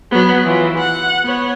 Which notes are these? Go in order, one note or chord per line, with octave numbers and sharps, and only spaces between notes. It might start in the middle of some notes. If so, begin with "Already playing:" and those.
F#3 B3
E3 F4
F#5
B3 C#5